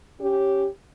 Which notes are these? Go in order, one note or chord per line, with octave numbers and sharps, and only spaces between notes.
C#4 G4